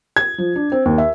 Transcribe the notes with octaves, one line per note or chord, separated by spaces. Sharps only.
G#6
F3
D4
C4
D#2
E5